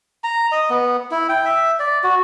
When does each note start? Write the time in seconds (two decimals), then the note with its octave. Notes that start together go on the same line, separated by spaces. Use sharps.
0.24 A#5
0.52 D#5
0.70 B3
1.11 E4
1.29 G5
1.45 E5
1.79 D5
2.04 F#4